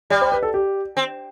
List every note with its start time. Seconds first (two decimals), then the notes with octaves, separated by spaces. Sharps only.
0.10 G3 D5
0.21 C5
0.32 B4
0.43 A4
0.54 G4
0.97 C4